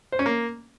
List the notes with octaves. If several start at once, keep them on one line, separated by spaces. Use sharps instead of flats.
C5
C#4
A#3